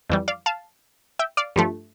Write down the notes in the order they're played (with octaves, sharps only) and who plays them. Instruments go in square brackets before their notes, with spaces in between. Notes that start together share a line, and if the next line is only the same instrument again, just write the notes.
[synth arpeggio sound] F2 E3 G3
D5 F5
F5 A5
E5 G5
D5 F5
G2 F3 A3